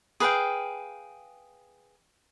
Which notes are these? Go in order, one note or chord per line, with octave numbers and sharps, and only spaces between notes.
G#4 B4 F5 G5